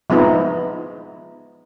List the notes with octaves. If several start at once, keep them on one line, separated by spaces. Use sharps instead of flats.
F3 G#3 B3 D#4 E4